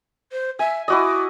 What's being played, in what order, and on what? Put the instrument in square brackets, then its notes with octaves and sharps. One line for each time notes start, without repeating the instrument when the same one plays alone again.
[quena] C5
[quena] E5 [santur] G#5
[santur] E4 F#4 D#5 [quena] D6